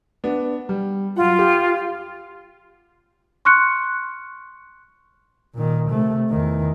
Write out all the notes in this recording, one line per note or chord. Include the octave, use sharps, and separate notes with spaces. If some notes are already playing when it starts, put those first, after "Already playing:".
B3 D4
G3
F#2 F4 F#5
G4
C6 C#6 F6 F#6 C#7
A#2 D#3
C3 A3
E2 D#3